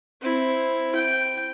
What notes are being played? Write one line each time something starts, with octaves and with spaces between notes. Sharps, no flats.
C4 E4
G5